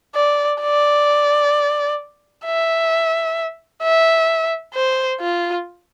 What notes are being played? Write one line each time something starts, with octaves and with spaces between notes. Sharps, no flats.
D5
D5
E5
E5
C5
F4